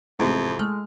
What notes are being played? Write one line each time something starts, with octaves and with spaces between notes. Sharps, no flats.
A1 F2 G#2 C3
G#3 A3 F6